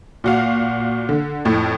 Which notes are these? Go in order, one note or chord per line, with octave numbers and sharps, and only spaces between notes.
A#2 F#4 F5
D3
F2 A2